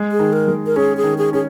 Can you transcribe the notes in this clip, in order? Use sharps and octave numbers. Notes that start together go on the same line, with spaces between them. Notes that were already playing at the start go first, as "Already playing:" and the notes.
Already playing: G#3
G#4
D#3
A#4
G#3
A#4
C#4 G#4
G#4
D#3
G#4
C#4 G#4